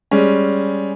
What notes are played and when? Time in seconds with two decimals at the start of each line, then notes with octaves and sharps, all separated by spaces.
0.11 G3 G#3 C#4